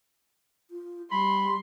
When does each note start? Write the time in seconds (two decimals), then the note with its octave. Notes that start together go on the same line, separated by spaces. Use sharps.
0.71 F4
1.11 G3 B5 C6